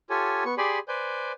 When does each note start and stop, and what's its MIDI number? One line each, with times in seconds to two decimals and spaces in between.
0.10 0.44 65
0.10 0.44 67
0.10 0.44 69
0.10 0.44 73
0.10 0.44 80
0.45 0.55 59
0.45 0.55 85
0.58 0.79 67
0.58 0.79 68
0.58 0.79 74
0.58 0.79 80
0.58 0.79 83
0.58 0.79 84
0.88 1.32 71
0.88 1.32 72
0.88 1.32 74
0.88 1.32 80
0.88 1.32 91